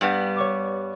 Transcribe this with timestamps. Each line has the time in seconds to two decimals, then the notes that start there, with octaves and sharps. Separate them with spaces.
0.01 G2 G3 B3
0.36 C#5 C#6 D6